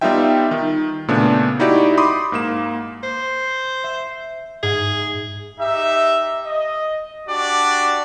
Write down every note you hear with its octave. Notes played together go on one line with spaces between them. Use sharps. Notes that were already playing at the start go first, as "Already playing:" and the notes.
G3 B3 D#4 F4 E5 G5
D#3
A#2 C#3 A3 B3 D4
D#4 E4 F#4 G4 D5
B5 C6 D6 D#6
G#2 A#3 E7
C5
E5
G#2 G#4
D#4 G4 E5
D#5
D4 F#4 G4 D5